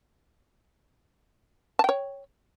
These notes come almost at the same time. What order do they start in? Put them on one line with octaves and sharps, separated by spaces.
A5 G5 C#5